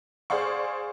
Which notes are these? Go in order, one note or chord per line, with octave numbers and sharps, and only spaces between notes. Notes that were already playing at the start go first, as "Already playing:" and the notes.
G#4 C5 D5 F5 C#6